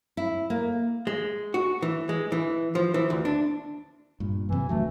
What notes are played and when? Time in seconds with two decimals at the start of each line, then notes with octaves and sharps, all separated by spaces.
0.17 E4
0.50 A#3
1.07 G#3
1.54 F#4
1.82 E3
2.09 G#3
2.32 E3
2.75 F3
2.94 E3
3.10 D2
3.25 D4
4.20 G2 A#2
4.49 F#2 C3 E3
4.69 D#1 D2 F#3 A3